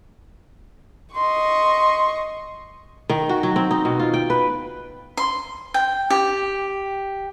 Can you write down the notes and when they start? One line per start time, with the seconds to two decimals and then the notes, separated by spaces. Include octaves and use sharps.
1.16 D#5 C6 C#6
3.10 D#3
3.29 F#4
3.43 F#3
3.56 C4
3.71 D#4
3.85 B2
3.99 F4
4.14 G5
4.30 B4
5.17 C6
5.74 G5
6.10 G4